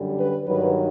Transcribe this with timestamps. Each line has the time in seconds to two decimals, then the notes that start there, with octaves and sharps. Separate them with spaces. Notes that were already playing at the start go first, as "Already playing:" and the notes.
Already playing: F#2 D3 G3
0.17 B4
0.46 G2 D#3 F#3 B4